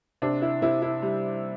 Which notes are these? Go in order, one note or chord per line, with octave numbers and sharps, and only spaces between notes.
C3 D4
E4
C3 E4
E4
G3